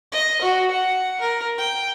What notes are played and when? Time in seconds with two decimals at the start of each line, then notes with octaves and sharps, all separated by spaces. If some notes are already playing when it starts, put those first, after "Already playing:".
0.12 D#5
0.42 F#4
0.71 F#5
1.21 A#4
1.58 G5